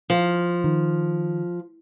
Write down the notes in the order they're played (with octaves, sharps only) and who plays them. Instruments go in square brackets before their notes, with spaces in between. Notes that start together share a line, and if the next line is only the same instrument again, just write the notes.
[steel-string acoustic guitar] F3
[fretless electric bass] D#3